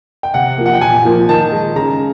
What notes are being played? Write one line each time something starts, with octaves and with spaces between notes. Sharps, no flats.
G5
C3 F#5
F3 A#3
F#5
G5
A#2 G#5
F3 A#3
D#3 A5
G#3
C#3 A#5